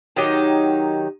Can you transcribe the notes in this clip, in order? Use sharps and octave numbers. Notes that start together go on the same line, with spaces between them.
D#3 F#3 D#4 G4